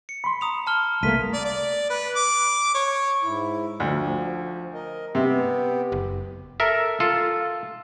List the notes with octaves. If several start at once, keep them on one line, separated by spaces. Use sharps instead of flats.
C#7
B5 C6
A#5 D#6 F7
A5 F6 G7
C2 A3 A#3 B6 D#7
D5
D5
B4
D6
C#5
G#2 E4
D2 F3
A#4 D#5
C3 B3 G4
F#1
A4 A#4 E5
F4 A4